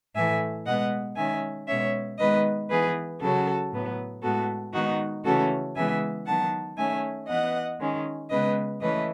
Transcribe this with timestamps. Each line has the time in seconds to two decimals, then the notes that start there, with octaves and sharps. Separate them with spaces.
0.15 A2 E3 A3 E5 G#5
0.66 B2 G#3 B3 D#5 F#5
1.17 D#3 G#3 C#4 E5 G#5
1.68 B2 G#3 C#4 C#5 E5
2.19 D#3 G#3 B3 B4 D#5
2.70 E3 B3 G#4 B4
3.21 C#3 F#3 C#4 F#4 A4
3.72 A2 F#3 B3
4.23 A2 G#3 B3 F#4 A4
4.73 D#3 G#3 B3 D#4 F#4
5.24 C#3 E3 A3 C#4 F#4 A4
5.75 C#3 E3 G#3 B3 E5 G#5
6.26 D#3 F#3 B3 F#5 A5
6.77 D#3 A3 C#4 E5 G#5
7.28 E3 B3 D#5 F#5
7.80 D#3 G#3 C#4
8.30 C#3 G#3 B3 B4 D#5
8.81 E3 A3 C#4 B4 D#5